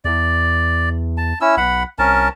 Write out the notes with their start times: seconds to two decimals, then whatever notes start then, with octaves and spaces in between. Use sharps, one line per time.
0.05 E2 D5
1.17 A5
1.41 C#4 E4 E6
1.57 B1 F#5 B5
1.99 C2 C#4 A#4 A5